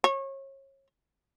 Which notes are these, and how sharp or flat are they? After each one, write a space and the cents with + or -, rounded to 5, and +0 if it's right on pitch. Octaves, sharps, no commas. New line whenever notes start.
C#5 -30